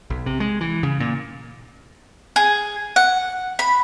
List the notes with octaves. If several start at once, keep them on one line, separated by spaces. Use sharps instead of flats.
B1
C3
G#3
E3
C#3
A#2
G#4
F#5
B5